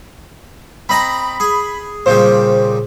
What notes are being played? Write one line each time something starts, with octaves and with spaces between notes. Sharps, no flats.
C4 D#5 A#5 B5
G#4
A#2 C#3 G3 C5